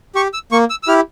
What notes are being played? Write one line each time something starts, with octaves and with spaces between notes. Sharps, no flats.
G4 C#6
E6
A#3 C#6
E6
E6
E4 G4 F6